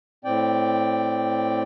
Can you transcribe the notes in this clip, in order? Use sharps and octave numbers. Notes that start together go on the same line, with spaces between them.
A2 C4 D5 G5